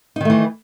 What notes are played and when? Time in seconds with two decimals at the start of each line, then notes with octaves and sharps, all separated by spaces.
0.16 D#4
0.21 D#3
0.25 A3
0.30 E3